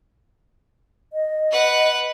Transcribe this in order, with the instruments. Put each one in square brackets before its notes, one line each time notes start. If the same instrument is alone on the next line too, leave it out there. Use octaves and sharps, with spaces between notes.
[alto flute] D#5
[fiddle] B4 F#5